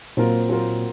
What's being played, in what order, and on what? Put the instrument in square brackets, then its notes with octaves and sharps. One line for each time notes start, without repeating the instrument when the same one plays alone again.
[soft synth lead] A#2 [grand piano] F#3 C4 F4 A#4
[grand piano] F#3 C4 F4 A#4